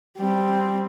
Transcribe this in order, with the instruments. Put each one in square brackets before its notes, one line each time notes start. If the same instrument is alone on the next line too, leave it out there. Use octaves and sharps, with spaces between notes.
[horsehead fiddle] G3 C4